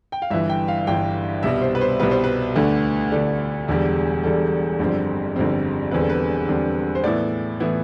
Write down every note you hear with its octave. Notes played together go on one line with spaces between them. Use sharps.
G5
F5
G1 G2 E3 E5
G5
F5
G1 G2 E3 G5
C2 B2 G3 E5
C5
B4
C5
C2 B2 G3 B4
C5
B4
D2 D3 A3 D4
D2 D3 A3 D4 A4
E1 E2 D3 G3
E1 E2 D3 G3 A4
G1 F2 D3 G3 C4
G1 F2 D3 G3 C4
E1 E2 D3 G3 C4 B4
A4
B4
E1 E2 D3 G3 C4
C5
A2 E3 B3 E4 D5
A2 E3 B3 E4